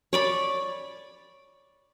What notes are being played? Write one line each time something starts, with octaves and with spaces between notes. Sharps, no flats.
C#5 D5 B5